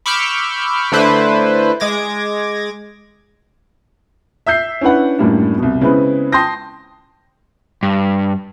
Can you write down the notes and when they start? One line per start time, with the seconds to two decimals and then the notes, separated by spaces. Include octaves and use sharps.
0.06 B5 C#6 D6 E6 F6 G6
0.92 D3 A3 D4 E4 B4 C5
1.80 G#3 D6 G#6 A#6
4.47 E5 E6 G6 C7
4.81 C#4 D4 E4 B4 F#5
5.19 F#2 A2 G3 A#3 D4
5.58 C2 B2
5.81 C#3 G#3 B3 C4 E4 B4
6.33 G5 A5 C6 D#6 G6 A#6
7.83 G2